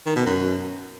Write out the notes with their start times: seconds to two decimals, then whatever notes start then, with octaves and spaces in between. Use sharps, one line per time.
0.06 D#3
0.16 B2
0.26 F#2